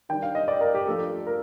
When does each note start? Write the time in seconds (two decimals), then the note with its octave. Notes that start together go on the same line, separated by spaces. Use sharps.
0.09 D#3 G3 D4 G5
0.23 F5
0.35 D#5
0.48 D5
0.61 A#4
0.74 G4
0.87 F3 A3 D4 F4 A4
1.27 A#4